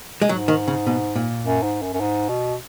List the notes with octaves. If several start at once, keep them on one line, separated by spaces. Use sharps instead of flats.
G#3
G#2 F#3
D#3
C#3
B2
A#2
F#2
G#2
F#2
F#2
G#2
B2